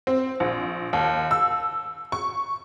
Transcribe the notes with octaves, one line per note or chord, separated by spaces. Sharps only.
C4
A#1
D#2
E6
C#6